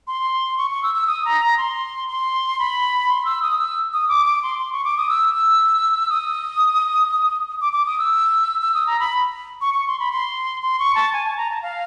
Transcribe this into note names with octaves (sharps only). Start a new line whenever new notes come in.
C6
C#6
C#6
E6
E6
D#6
A#5
A#5
C6
C6
B5
C6
E6
D#6
E6
D#6
D6
D6
C6
C6
C#6
D6
D#6
E6
E6
D#6
D6
D6
D#6
E6
E6
D#6
A#5
B5
C#6
C#6
C6
B5
C6
C6
C#6
A5
G#5
A5
A#5
A5
F5